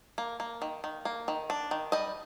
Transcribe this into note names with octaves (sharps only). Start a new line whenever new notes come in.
A#3
A#3
D#3
D#3
A#3
D#3
D4
D#3
G3 D#5